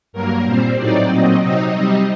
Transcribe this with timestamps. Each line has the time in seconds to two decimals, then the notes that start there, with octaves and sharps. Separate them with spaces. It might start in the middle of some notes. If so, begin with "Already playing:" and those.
0.13 G2 F#3 A#3 A#4
0.45 A#2 G3 C4 C5
0.77 A2 F#3 C4 D#4 D5
1.09 A#2 F#3 C4 D#5
1.41 C3 F#3 C4 D#4 D#5
1.73 C3 G3 C4 D#4